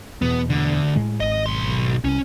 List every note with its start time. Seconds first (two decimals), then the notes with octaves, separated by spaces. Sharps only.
0.22 E2 B2 B3
0.50 D2 D3
0.96 A2 G#3
1.20 G#1 D#5
1.46 B1 C6
2.04 C2 C#4